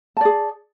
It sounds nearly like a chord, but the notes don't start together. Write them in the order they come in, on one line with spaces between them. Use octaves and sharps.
A5 D5 G#4